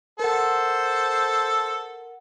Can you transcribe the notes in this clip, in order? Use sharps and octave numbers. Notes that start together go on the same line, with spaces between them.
A4 A#4 C5 F#5